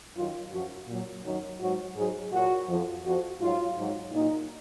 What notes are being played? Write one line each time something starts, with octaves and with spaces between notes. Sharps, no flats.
F#2 D#3 F#3 F4
F#2 F3 F#4
A#2 F#3
F#2 D#3 F#3
G#2 F#3 F#4
G#2 F#3 G#4
A#2 F#3 F#4
F2 F3
F2 F3 F#4
G#2 F#3 F4
G#2 F#3
A#2 F#3 D#4